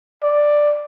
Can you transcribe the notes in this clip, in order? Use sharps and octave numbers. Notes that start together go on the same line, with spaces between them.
D5